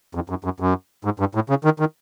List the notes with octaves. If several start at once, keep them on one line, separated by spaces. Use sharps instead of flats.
F2
F#2
F#2
F#2
G#2
G2
A2
C#3
D#3
D#3